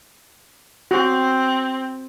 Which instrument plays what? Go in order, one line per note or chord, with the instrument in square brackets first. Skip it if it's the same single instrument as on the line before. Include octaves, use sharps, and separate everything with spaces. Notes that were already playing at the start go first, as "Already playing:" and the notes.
[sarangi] C4 [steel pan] F#4 G5